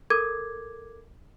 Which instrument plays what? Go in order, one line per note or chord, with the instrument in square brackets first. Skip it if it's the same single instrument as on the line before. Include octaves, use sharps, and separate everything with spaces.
[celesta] A4 A#4 D6 G#6